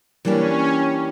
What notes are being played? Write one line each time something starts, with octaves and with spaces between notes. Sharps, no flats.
E3 G3 A#3 C#4 D4 G4